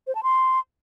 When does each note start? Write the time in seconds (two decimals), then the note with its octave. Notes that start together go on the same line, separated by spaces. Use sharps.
0.07 C5
0.15 A5
0.23 C6